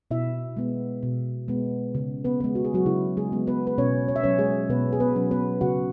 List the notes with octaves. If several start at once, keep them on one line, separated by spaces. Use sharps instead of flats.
B2 E4 E5
G#3 B3
B2
G#3 B3
C#3
B3 B4
G#3 B3
F#4
G#4
F#3 F#4
C#3 E4
G#3 G#4
G#3 B3
B3 B4
B4
B2 C#4 C#5
C#5
E5
F#3 C#4 C#5
G#3 G#4
B2 B3 B4
G#4
B3 B4
F#3 C#4
B3 B4
C#3 F#4 F#5